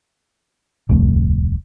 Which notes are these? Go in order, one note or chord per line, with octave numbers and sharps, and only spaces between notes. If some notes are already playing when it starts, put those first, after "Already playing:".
D1 C2 F2 A3